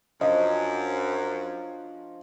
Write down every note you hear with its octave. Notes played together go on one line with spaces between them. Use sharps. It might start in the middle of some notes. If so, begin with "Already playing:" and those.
F#2 F3 D4 F4 D#5